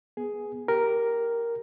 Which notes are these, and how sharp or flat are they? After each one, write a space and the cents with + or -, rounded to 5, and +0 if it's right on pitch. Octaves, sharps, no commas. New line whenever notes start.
B3 -5 G#4 +5
G4 -10 A#4 +0